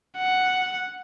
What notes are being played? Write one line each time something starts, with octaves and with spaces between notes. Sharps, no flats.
F#5